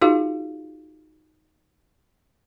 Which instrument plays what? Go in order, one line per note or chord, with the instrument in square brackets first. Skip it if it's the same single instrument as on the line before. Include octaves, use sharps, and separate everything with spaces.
[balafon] D#4 F4 F#4 G#4 F5